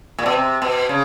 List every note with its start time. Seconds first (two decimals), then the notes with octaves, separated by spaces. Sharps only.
0.18 A#2
0.26 B2
0.33 C3
0.62 B2
0.89 C#3